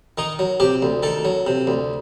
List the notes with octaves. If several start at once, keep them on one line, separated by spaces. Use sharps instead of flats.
D#3 D#4
F#3
C3 G4
D2
D#3 A4
F#3
C3
D2